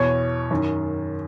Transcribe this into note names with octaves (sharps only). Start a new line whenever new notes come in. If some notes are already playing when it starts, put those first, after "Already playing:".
Already playing: E2 B2 C#5
F#2 D#3